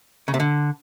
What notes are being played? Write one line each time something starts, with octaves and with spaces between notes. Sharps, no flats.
C#3
C3
D3